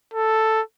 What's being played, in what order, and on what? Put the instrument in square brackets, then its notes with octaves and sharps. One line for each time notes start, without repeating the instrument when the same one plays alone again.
[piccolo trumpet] A4